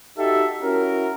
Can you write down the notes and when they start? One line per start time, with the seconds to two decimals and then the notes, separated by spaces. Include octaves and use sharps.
0.18 D#4 F#4 G4 A4 E5
0.63 C#4 E4 F#4 A#4